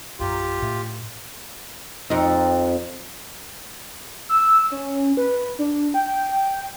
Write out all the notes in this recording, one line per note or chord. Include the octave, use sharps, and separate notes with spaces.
A#1 F#2 F4 G4 A#5
A2
F2 D#4
E6
C#4
B4
D4
G5